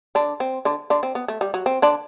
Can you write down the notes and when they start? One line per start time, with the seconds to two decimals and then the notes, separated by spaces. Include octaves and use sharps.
0.15 D3 D4
0.40 C4
0.65 D3 D4
0.90 D3 D4
1.03 C4
1.15 B3
1.28 A3
1.41 G3
1.54 F#3
1.66 C4
1.82 D3 D4